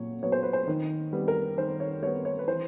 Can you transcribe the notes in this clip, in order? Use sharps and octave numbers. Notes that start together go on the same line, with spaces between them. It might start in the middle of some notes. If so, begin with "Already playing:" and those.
Already playing: A#2 F#3 C#5
F#3 B3 C#5
C5
B4
C5
D#3
G3 B3
A#4
D#3 C5
C#5
G3 B3 C#5
C#5
B4
E3 C5